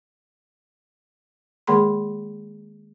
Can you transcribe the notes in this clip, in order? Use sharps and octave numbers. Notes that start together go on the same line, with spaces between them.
D#3 G#3 A#3 G#4 B5 C6